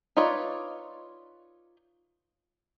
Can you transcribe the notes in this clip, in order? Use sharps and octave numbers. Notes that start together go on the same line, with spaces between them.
D#4 F4 B4 C#5 D5